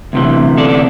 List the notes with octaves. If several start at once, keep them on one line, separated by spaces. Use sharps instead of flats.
D2 C3 E3
A4 D5
D5